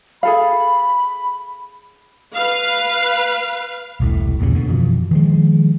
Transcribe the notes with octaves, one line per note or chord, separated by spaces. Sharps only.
G#4 A4 F5 B5
B4 F5
E1 C2 A2
B1 E2 A#2 C#3
B2 D3
F#2 B2 E3 F3
D#3 F3 G#3